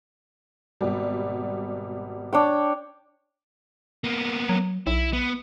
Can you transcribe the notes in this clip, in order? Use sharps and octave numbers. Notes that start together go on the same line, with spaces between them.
G#1 B2 G3
D4 C#5 G5
A#3 B3
F#3
B1 E4
B3